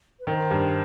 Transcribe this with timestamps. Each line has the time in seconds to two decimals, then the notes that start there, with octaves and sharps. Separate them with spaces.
0.19 B4
0.27 D#3 C5
0.51 G2